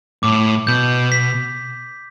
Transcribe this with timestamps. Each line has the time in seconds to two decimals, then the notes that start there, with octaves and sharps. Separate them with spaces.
0.23 A2 D6
0.67 B2 G6
1.12 B6